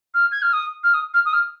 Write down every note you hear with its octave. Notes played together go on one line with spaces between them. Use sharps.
F6
G#6
F6
D#6
F6
D#6
F6
D#6
F6